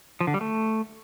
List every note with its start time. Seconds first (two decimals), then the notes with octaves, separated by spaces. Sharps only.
0.20 F3
0.27 D3
0.34 G3
0.41 A3